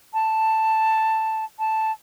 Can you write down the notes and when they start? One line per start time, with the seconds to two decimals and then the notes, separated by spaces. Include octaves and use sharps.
0.14 A5
1.59 A5